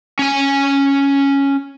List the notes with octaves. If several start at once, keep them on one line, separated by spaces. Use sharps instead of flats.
C#4 G#5